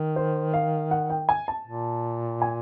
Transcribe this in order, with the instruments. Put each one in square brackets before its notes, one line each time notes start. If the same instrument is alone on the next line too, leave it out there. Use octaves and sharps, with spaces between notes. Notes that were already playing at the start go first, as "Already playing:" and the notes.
Already playing: [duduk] D#3
[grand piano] C5
F5
F#5
G5
G#5
A5
[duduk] A#2
[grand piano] G#5